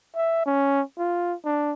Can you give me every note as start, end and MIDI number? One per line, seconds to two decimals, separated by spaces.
0.15 0.42 76
0.46 0.81 61
0.98 1.34 65
1.45 1.73 62